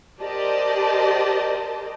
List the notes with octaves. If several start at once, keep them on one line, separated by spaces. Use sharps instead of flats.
G4 A#4 C5 D5 D#5 A5